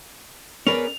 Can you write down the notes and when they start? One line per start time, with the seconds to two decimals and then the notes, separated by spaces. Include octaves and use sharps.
0.67 B3 C#4 G#4 A#4 B4 D5 F7